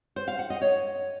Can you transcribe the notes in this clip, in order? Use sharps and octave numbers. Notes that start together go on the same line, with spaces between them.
C5
F5
F#5
D#5
C#5